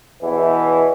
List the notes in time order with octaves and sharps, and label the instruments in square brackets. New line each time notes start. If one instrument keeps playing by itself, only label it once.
[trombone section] E2 B2 E3